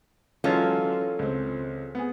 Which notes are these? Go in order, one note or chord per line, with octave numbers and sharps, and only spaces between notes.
E3 F#3 G#3 C#4 F4 A4
C#2 C4
B3 G#4